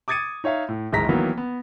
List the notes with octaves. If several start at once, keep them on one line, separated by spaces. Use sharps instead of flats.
D6 D#6 G#6 A6 C#7 D#7
D#4 C#5 E5 F5
A2
D1 G#1 G#3 A#5 A#6 B6
D#3 E3 F#3 A#3 B3
B3